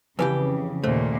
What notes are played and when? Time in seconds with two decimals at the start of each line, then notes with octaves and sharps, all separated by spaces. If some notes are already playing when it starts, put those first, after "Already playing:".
0.19 F2 C#3 E3 G4 B4 G#5
0.84 D#2 A#2 A3 C5